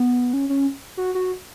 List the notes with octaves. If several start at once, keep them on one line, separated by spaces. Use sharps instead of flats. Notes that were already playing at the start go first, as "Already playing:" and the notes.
Already playing: B3
C#4
C#4
F#4
F#4